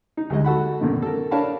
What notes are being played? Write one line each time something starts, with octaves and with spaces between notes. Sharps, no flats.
D#4
D2 G3 G#3 D#5
F#4 A4 F#5 B5
F#2 B2 D3 D#3
A4 A#4
D4 A#4 C#5 F5 A5 B5